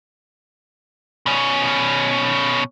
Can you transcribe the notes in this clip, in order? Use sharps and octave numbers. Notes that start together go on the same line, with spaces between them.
B2 C#4